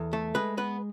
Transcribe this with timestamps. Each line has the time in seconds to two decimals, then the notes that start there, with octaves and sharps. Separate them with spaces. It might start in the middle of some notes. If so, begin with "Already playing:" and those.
Already playing: E2 A4
0.13 A3
0.35 G#3 B4
0.57 B3 B4